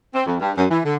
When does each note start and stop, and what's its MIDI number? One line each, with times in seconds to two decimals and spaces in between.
0.14 0.22 60
0.26 0.36 41
0.40 0.51 43
0.57 0.65 42
0.70 0.78 52
0.84 0.95 50